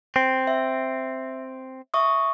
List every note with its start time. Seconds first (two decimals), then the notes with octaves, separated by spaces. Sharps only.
0.16 C4
0.47 E5
1.94 E5 C#6 D#6